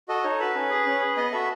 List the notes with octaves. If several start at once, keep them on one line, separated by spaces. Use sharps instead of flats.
F#4 A4 D#5
D#4 C#5
F#4 A4 B4
C#4
G#4
C#4
G#4
B3 D#5
F#4 A4 E5